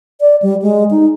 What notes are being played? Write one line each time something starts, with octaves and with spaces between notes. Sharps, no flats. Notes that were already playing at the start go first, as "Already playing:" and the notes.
D5
G3
G#3
D#4